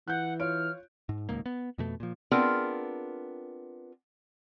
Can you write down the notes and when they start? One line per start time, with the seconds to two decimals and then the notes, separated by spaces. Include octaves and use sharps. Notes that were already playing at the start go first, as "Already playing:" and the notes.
0.08 E3 F#5 F#6 G6
0.40 F4 C#5 F6 D7
1.09 G#2
1.29 D#1 C#2 G#2 A#3
1.46 B3
1.78 F2 B2 A3
2.00 A#2 F3
2.31 B3 C4 D4 F4 G#4 A#4